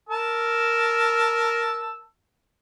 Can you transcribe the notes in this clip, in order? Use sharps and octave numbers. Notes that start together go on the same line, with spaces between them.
A#4 A5 E6